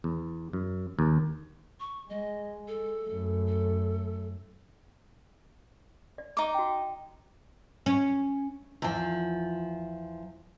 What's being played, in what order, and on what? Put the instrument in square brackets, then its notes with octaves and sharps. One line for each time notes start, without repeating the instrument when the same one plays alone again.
[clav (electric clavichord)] E2
F#2
D#2
[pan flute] C#6
[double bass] G#3 [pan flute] D#5
[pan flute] A4
[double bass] F#2 A3
[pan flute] A4
[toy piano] D5
[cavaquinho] D#4 D6
[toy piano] F#4 G5
[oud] C#4
E2 F3